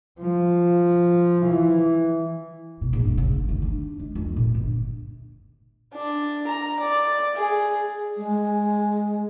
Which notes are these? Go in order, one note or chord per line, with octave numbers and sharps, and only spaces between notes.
F3
E3
B2
A#1
G2
C#3
G1
D#3
D4
G#3
F2
A#2
G1
D4
A#5
D5
G#4
G#3